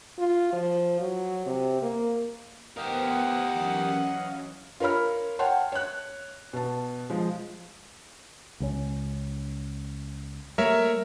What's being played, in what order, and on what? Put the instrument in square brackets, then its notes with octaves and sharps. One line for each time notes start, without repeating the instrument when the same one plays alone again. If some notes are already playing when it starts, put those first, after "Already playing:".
[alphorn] F4
F3
F#3
C3
A#3
[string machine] B3 C5 [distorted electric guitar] G4 A#4 [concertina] D#5 F5 [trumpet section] F#5
[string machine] E3 F#3 C#4
[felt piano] F4 A#4 C#5 B5 F6
C#5 F#5 G5 A5 C6
C#5 F#6
B2 A5
F3 G#3
[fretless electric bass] C#2 F3 C#4
[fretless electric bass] G3 A3 A#3 [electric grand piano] A#4 C#5 E5